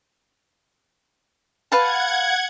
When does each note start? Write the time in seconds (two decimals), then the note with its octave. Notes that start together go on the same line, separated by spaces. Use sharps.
1.72 B4 F5 F#5 A5 G#6